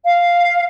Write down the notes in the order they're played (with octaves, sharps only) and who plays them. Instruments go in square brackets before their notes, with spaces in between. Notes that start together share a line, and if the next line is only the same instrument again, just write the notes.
[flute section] F5